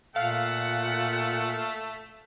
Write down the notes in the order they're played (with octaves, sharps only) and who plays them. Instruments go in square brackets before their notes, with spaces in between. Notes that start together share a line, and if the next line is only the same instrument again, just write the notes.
[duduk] A#2 [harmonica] A3 [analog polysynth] F5 [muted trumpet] F#5